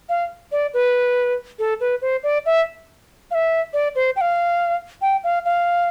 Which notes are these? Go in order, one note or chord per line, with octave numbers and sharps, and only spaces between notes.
F5
D5
B4
A4
B4
C5
D5
E5
F5
E5
D5
C5
G5
F5
G5
F5
F5